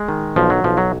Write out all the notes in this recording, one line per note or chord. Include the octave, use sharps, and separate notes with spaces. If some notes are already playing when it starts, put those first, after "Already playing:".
Already playing: G#3
D#3
B1 F3
F#3
B1 F3
F#3